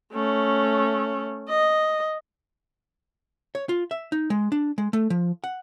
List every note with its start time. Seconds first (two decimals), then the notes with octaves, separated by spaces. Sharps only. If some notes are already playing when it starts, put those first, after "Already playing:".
0.13 A3 C#4
1.49 D#5
3.55 C#5
3.69 F4
3.91 E5
4.12 D#4
4.30 G#3
4.52 D4
4.78 G#3
4.93 A3
5.10 F3
5.44 F#5